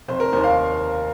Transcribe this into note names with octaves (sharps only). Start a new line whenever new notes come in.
F1 C5
A#4
D#2 D#3 C5
C5 F5